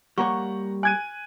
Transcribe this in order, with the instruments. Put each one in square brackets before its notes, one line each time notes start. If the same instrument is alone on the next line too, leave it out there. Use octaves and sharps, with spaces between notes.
[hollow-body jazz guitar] G3 A#3 C#5 [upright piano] F#5 A#5 [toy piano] C#6
[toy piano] G#5 [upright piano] F#6 G#6 D#7